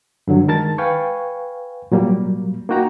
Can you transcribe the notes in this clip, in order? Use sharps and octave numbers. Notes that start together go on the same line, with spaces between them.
G2 D3 F#3
D#3 G#3 A#4 A5 A6
B4 F5 G5 G#5 C#6
A#2 F#3 G3 A#3
A#3 D#4 F#4 G5 A#5